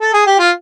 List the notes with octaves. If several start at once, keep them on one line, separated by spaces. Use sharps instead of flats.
A4
G#4
G4
F4